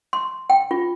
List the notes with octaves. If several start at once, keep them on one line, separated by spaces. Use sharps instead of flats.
C6
G5
F4